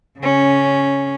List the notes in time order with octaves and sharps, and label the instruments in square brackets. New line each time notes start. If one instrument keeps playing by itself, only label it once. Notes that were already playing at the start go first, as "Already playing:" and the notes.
[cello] C#3 C#4